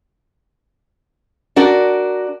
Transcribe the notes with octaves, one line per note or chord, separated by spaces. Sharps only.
D4 F#4 A#4